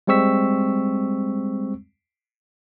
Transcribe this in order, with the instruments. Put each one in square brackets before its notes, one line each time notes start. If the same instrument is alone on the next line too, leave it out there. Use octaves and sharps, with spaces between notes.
[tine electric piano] G3 G#3 C4 C#6 E6 B6